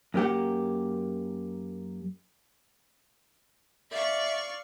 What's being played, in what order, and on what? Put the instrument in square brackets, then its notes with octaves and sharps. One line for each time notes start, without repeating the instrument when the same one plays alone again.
[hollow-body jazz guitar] F#2 A#3 G4 F#5
[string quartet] D5 F5 C#6 [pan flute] E5